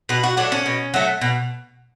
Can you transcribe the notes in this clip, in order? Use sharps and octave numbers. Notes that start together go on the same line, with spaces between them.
B2 B4
F#4
F#3 A3 D4
C#4
B2
F#3 A3
B2